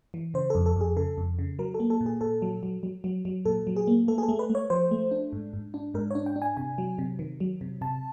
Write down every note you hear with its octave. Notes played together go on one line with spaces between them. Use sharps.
E3
C#3 C5
A4
F2
A4
F2 G#4
C#3 A4
F2
C#3
F#3 A#4
A4
A#3
A4
A#2
G#4
A#2 A4
F#3
F#3
F#3
F#3
F#3
A#2 A4
F#3
G#4
A#3
A3 A4
G#4
A4
A3
B4
A3
C#5
F3 C5
A3
D4
G#2
G#2
D4
G#2 A#4
C#5
D4
G5
D4
G#5
C3 G#5
F#3
C3
D#3
F#3
C3
C3 A5